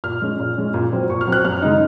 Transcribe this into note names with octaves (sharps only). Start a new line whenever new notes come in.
A#2 F6
G#3 C#4
A#2
G#3 C#4
A#2
F#3 C4
A#2 C#6
F6
F#3 C4 F#6
F#2 F6
C#3 G#3 D#4